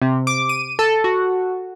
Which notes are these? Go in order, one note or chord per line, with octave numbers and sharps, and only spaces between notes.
C3
D6
D#7
A4
F#4